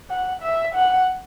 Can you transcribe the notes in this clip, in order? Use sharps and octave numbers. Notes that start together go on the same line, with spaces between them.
F#5
E5
F#5